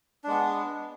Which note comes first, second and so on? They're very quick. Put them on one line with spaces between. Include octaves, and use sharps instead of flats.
D4 G#3 B3